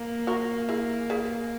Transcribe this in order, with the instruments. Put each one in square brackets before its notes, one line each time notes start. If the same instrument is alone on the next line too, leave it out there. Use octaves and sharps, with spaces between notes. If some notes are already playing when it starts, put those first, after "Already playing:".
Already playing: [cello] A#3
[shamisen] F#4 A#4
E4 G#4
G#4 B4